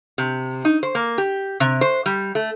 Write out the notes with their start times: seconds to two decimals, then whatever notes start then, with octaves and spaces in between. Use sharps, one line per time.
0.18 C3
0.65 D#4
0.83 C5
0.95 A#3
1.18 G4
1.60 C3
1.81 C5
2.06 G3
2.35 A3